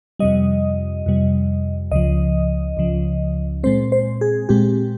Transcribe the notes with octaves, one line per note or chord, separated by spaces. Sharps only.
F2 C3 G3 D#5
F2 C3 G3
C#2 C#3 F3 D#5
C#2 C#3 F3
A#2 G#3 C4 C5
C5
G#4
A#2 G#3 C4 G4